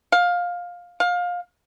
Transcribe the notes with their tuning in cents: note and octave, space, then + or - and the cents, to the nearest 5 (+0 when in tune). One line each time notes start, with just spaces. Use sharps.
F5 +15
F5 +25